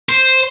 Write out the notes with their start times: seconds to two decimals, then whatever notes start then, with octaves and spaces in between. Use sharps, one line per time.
0.09 C5